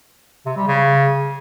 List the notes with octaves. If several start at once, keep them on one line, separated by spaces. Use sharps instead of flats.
C3
G3
C#3